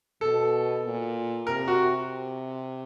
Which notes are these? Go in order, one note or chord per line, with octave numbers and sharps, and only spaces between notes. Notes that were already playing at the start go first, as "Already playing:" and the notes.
B2 A4
A#2
C3 A#4
F#4